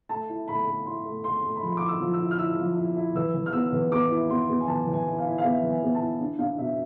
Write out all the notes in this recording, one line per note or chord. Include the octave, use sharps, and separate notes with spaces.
A3 A5
E4
A3 B5
A3
E4 C6
A3
A3 C6
A3
B5
F3 C6
E4 D6
E6
F3
E6
E4
F6
E4 E6
F3
E4
E4
E3 E6
E3
F6
B3 E6
E3
B3 D6
E4
B3 C6
B3
G#5
E3 A5
E3
G#5
E4
F5
E4
F5
B3 E5
E3
G#5
B3
A5
E4
D4
D4 F5
B2 E5